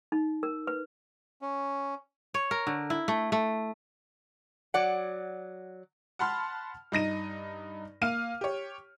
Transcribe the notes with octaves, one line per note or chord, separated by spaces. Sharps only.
D#4
A#4
B4
C#4
C#5
A#4
D3
E4
A3
A3
F#3 D5 F#5
F#5 A5 B5 C6 F6
G2 D#4 A#6 D#7
A#3 F5 F6 D#7
G4 C#5